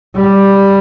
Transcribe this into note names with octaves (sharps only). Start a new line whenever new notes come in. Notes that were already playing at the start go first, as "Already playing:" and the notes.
G3